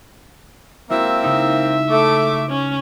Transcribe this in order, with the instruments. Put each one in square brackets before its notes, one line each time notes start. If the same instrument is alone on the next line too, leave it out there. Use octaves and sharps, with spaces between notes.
[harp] G#3 E4 F#4 [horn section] A#3 C4 [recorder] E5
[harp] C#3 D#4
[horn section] A3 [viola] D6
[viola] C#4